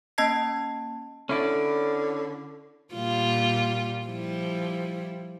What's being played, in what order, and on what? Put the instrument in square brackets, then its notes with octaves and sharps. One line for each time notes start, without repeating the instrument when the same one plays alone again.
[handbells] A#3 C#4 D#5 A5 G#6 C7
[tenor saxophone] D3 [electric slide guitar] C#4 E4 D5
[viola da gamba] A#2 G3 F4
F3 G3 E4